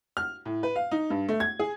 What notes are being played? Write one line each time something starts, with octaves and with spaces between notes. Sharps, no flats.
F6
A2
B4
F5
D#4
G2
A3
G#6
G#4